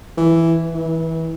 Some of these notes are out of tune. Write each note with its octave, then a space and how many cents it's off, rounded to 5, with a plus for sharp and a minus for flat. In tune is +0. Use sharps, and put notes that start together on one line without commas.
E3 +5
E3 -25